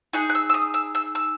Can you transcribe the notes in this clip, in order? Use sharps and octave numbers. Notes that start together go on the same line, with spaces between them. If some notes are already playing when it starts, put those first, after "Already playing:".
D#4 G#4 F#6
F#6
E6
E6
D#6
E6
E6
E6